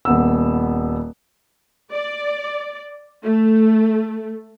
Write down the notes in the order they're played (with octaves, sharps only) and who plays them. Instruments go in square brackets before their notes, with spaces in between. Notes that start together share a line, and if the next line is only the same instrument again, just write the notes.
[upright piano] D#1 B3 E6
[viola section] D5
A3